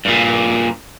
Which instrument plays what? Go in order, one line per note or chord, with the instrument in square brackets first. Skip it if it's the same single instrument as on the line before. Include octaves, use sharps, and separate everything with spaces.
[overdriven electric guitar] G2 A#2